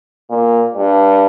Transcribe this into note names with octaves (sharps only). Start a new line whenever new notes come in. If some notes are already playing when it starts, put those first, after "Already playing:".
A#2
G2